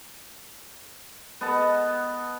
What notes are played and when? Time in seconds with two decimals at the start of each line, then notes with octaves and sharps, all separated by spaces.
1.41 B3 D#5 F#5 A5